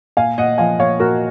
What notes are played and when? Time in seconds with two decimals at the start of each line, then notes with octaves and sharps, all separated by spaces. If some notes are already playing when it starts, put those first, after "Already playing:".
0.17 A#2 F5 G#5
0.38 A#2 D#5 F#5
0.58 F3 F5 G#5
0.79 A#2 C#5 F5
0.99 A#2 F#4 A#4